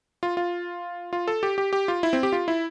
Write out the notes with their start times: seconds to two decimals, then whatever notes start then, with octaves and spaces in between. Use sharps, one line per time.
0.23 F4
0.37 F4
1.13 F4
1.28 A4
1.43 G4
1.58 G4
1.73 G4
1.88 F4
2.03 E4
2.13 C4
2.23 G4
2.33 F4
2.48 E4